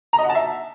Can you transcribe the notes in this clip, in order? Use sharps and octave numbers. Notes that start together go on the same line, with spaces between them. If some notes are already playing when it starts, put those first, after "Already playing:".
A#5
D#5
F#5
A5
E5